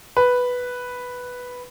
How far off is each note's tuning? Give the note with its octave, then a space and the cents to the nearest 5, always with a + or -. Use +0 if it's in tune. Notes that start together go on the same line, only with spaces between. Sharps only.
B4 +0